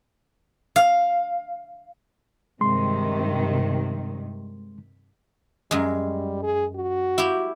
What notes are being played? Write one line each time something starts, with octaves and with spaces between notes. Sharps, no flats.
F5
G2 C3 D#3 G#3 C6
F#2 G3 G#3
G#4
F#4
E4 G4